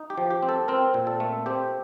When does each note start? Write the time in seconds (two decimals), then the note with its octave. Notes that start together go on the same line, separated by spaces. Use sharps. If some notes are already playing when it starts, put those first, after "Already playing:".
Already playing: D#4
0.10 G4
0.18 F3
0.30 G4
0.43 C4
0.49 A4
0.68 C4 A#4
0.94 A#2
1.07 A4
1.20 A3
1.46 C4 G4